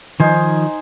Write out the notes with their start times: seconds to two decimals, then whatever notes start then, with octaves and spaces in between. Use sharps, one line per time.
0.20 D#3 F3 D#4 C5 G#5